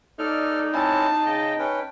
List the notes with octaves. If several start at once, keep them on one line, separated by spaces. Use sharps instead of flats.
D#4 A4 D5 F6
C4 C#4 E4 A5
C#3 D#5 G5
C#4 B4 G5